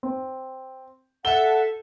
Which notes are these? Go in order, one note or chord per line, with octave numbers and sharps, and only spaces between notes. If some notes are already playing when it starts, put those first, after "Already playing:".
C4
A4 E5 F#5 G7